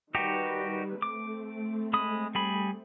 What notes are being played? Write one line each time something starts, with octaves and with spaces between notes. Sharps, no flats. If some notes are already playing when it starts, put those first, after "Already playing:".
D#3 G3 D#4 F#4 G4 B4
A3 C4 D6
G#3 B5 D#6
G3 G#4 B5